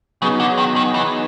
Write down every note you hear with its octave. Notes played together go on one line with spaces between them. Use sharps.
C#3 F#3 B3 D#4 G#4
D3
D#3
D#3
E3